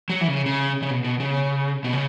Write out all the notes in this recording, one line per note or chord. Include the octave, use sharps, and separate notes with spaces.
F#3
E3
C#3
C#3
C#3
B2
B2
C#3
B2
C#3